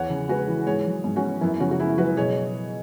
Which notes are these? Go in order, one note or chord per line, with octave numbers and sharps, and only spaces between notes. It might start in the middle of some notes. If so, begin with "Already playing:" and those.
Already playing: E2 C#5 F#5
C#3
G#3 F#4 B4
E3
G#2 G#4 C#5
F#3
G#2
C#4 F#4
B3
F#2 B3 E4
C#3 C#4 F#4
F#4
B3 E4 G#4
F#3 F#4 B4
B2 G#4 C#5